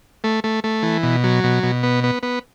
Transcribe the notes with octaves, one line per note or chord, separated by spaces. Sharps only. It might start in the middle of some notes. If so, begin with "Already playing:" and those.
A3
A3
A3
E3
B2
F#3
B2
B2
B3
B3
B3